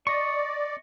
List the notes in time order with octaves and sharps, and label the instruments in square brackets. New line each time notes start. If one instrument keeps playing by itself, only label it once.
[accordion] D5 [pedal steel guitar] D#5 C#6